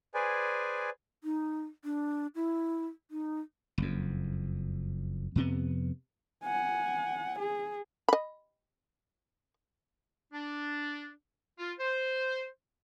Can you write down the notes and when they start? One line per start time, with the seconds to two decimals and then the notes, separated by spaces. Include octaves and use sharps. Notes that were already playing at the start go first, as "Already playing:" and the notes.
0.14 G#4 B4 C5 D5 G#5
1.24 D#4
1.84 D4
2.35 E4
3.11 D#4
3.78 F#1 F2
5.36 F2 C3 B3
6.44 F#5 G#5
7.38 G#4
8.09 D#5 B5
10.33 D4
11.59 F4
11.79 C5